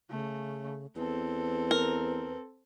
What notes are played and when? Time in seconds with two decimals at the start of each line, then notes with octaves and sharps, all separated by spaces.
0.11 C#3 A3
0.96 E2 C4 A4 B4
1.71 A#4